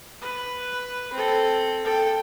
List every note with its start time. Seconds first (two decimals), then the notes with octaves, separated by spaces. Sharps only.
0.22 B4
1.13 C4 A4
1.84 A4 G5